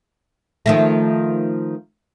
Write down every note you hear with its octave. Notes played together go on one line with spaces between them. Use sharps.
D#3 F3 A3